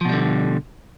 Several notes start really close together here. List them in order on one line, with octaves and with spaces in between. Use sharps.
F3 B2 G3 D3